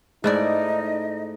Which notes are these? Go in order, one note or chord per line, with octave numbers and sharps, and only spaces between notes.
G#2 A3 D#4 E4 D5 D#5